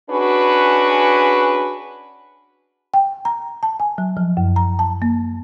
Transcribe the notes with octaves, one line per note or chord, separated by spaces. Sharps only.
C#4 D4 F#4 G#4 B4
G5
A#5
A5
G#5
F#3
F3
F#2
A#5
A5
A#3